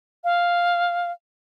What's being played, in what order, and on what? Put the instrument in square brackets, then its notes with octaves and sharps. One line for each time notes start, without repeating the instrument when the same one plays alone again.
[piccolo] F5